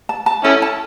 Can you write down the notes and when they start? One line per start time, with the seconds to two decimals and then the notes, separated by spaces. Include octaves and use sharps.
0.09 A5
0.26 A5
0.44 C#4 E4 A4
0.62 A5